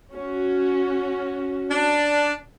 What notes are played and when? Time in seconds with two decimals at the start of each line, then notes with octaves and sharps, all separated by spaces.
0.12 C#4 F#4
1.71 D4